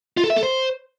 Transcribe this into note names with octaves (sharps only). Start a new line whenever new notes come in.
F4
A4
E5
A4
C5